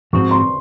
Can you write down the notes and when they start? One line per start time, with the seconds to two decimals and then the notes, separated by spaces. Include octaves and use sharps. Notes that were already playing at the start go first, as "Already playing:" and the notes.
0.13 G#2 F3 C4 F#4 C#6
0.31 C6